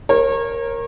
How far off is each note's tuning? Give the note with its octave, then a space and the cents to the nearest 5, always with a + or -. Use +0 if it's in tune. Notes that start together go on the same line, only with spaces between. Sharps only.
A#4 +0 C#5 -35